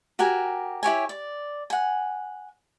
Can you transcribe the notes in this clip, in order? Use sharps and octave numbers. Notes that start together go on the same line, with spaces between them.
F#4 G4 A#4 G#5
E4 G4 C#5 G#5
D5
F#5 G#5